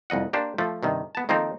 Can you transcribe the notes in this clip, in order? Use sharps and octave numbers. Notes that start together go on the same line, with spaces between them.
C2 F2 D#5 F#5
A#3 D4 G4 C5
F3 A3
G2 C3 D#3
B3 A5
D#3 F3 A#3 C4 D#4 A4